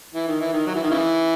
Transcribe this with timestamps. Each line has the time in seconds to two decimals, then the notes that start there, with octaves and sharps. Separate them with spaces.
0.14 E3
0.28 D#3
0.40 E3
0.53 D#3
0.66 F#3
0.75 E3
0.83 D#3
0.90 C#3 E3